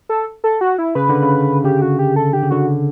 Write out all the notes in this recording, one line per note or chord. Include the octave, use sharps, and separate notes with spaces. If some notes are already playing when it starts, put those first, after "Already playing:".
A4
A4
F#4
E4
C#3 B4
D3
C#3
C#3 G4
F#4
G4
A4
D3 G4
C#3
D3 F#4